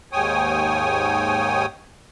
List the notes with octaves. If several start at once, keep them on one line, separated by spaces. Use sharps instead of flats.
D#2 G#2 C#5 G5 G#5 D#6